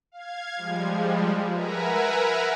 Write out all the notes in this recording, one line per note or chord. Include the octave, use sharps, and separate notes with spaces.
F5 G#6
F3 G3 G#3
A#4 B4 E5 F#5 G#5 A#5